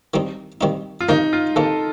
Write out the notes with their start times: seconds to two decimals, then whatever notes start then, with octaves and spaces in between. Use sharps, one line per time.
0.14 D#3 G3 C4 D#4
0.61 D#3 G3 C4 D#4
1.00 F4
1.08 C3 D#3 A#3 D#4
1.33 F4
1.56 C3 D#3 A#3 A4